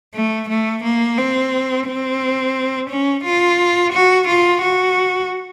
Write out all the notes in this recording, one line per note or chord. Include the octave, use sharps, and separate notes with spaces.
A3
A3
A#3
C4
C4
C#4
F4
F#4
F4
F#4